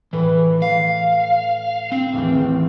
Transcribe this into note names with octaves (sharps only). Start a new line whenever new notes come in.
A2 E3 B4 C#5
F5
C4
A1 D#2 E3